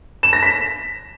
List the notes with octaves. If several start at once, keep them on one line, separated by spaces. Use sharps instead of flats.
E7
A#6
B6